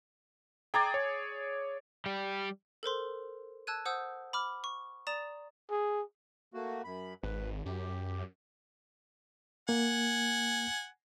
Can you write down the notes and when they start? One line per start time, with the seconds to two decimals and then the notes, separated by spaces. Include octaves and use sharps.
0.74 G#4 D5 G5 A#5 G#6
0.94 C#5
2.06 G3 G4
2.83 A4 A#4 C5 C6
3.67 A5 E6 F#6 G#6 D#7
3.85 C5 F#5 D#6 E6 G6
4.33 B5 D6 F6
4.64 C#6
5.07 D5 A#5 D#6 A6 E7
5.70 G#4
6.54 A3 A#3 F#4
6.84 F#2 B5
7.23 G#1 B4
7.66 F#2 G4
9.69 A#3 F#5 G#5